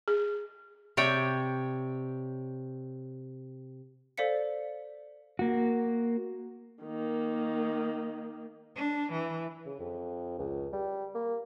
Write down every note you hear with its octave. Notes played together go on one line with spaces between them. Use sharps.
G#4
C3 C#5 D5 G5
A4 C5 D5 F5 B6 C#7
A#3 F#4
D#3 A#3
D4
E3
C#3
F2
C#2
G3
A#3